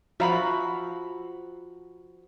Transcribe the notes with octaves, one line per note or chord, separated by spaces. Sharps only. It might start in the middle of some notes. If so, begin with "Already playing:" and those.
F3 F#4 E5 F5 A#5 B5